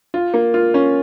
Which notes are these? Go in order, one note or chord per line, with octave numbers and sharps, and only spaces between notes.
F4
A#3
F4
C#4